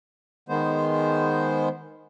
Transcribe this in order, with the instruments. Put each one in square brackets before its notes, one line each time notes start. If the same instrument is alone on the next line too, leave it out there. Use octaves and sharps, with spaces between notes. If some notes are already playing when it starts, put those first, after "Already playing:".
[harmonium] D#3 G#3 B3 C5